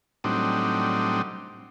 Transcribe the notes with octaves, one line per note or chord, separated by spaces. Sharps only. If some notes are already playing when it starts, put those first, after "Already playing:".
A2 F#3 G3 C4 D4 D#4